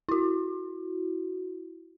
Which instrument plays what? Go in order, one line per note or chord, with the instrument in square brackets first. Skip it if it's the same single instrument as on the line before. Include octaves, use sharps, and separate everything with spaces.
[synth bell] E4 F#4